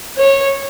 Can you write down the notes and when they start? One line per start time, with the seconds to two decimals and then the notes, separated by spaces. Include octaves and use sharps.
0.18 C#5